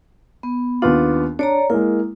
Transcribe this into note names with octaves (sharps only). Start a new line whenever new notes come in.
B3
D#2 B3 D4 F4
D4 C#5 D5 A#5
G#3 A#3 E4